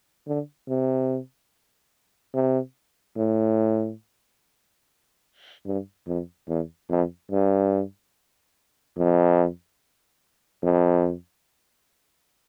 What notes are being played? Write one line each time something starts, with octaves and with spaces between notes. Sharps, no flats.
D3
C3
C3
A2
G2
F2
E2
F2
G2
F2
F2